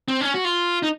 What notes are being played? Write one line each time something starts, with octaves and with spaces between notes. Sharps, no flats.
C4
C#4
F#4
F4
D#4